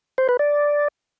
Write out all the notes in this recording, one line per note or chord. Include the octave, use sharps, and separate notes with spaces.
C5
B4
D5